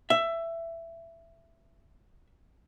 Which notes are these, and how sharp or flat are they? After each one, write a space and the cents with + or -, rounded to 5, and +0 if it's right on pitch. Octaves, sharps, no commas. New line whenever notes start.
E5 +15